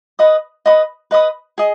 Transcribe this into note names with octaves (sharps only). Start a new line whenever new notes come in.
B4 D#5 B5 D#6
B4 D#5 B5 D#6
B4 D#5 B5 D#6
G#4 D#5